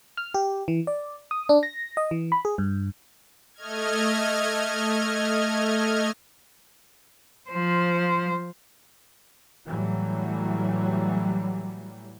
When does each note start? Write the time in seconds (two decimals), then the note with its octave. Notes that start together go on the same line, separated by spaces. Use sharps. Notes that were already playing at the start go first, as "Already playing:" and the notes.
0.17 F6
0.34 G4
0.68 E3
0.87 D5
1.31 D#6
1.49 D4
1.63 A#6
1.97 D#5
2.11 E3
2.32 B5
2.45 G#4
2.58 G2
3.54 A3 D#5 F6 G#6
7.50 F3 C5
9.65 A2 E3 F#3 G3